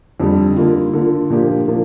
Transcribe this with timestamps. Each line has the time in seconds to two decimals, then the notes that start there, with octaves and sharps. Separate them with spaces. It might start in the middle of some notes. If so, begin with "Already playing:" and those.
0.20 F2 D3 G3
0.56 D3 A#3 F4
0.94 D3 A#3 F4
1.30 A#2 F3 A#3 D4 G4
1.68 A#2 F3 A#3 D4